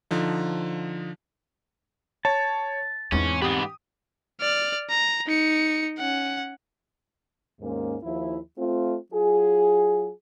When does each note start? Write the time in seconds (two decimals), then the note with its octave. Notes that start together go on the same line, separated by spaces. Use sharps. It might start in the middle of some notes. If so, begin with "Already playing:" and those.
0.11 D3 F3 D#4
2.25 C#5 A5
3.12 E2 G#2 E3 C4 C#4
3.42 G#2 B3 G4 D#6
4.41 D5 F6
4.90 A#5
5.27 D#4 C#7
5.98 C#4 F#5
7.60 D#2 G#2 G#3 A#3 C#4
8.03 D#2 F3 E4
8.57 A3 C4 F4
9.12 F#3 F4 G#4